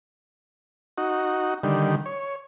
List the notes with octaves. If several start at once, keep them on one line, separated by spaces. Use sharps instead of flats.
D#4 F#4
D3 D#3 G3
C#5